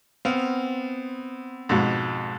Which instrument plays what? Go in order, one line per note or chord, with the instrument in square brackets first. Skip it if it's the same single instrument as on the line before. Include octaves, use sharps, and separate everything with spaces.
[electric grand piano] B3 C4 [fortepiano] F5
[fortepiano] F2 G#2 B2